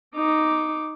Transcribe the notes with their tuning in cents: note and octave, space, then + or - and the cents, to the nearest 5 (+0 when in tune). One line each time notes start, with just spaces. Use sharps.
D#4 +0 D6 +0